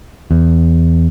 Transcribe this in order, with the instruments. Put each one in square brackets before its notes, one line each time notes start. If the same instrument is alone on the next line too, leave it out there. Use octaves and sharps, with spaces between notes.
[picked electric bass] E2